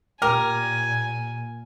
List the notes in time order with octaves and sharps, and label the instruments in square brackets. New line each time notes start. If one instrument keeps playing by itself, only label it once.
[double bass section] A#2 [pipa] G4 A#4 [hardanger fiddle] G#5 [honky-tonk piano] F6